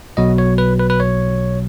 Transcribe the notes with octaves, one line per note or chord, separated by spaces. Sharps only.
B1 B2 F#3 D#5
C#5
B4
B4
B4
C#5